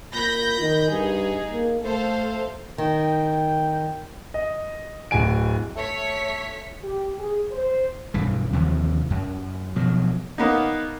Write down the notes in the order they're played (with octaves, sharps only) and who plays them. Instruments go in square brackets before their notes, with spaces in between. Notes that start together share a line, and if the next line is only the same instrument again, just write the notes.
[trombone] A#2 [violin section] B5 G6 A#6
[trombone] D#3
[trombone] G2 [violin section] D#4 G#4
[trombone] A#3
[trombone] A3 [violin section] A4 C5 F5
[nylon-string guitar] D#3 [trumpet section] G5
[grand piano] D#5
D1 D2 G#5 D7
[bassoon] A3 [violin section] C#5 B6
[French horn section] G4
G#4
C5
[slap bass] B1 G2 E3
D#2 C3 E3 F3
F#2
B2 F3 F#3
[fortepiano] A#3 B3 D#4